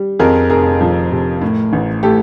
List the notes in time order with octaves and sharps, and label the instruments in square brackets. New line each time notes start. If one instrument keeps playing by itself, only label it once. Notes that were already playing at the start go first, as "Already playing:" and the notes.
Already playing: [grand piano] G3
F2 G#4 A#4
F1 G#4 A#4
F3
C3
A2
A1
A3 G4 A4